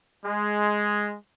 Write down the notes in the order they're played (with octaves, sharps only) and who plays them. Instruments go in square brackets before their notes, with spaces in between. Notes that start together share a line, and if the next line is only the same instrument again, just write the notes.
[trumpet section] G#3